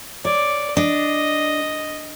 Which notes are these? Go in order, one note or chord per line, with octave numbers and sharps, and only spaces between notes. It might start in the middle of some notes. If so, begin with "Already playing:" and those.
C#5 D5
D4 D#5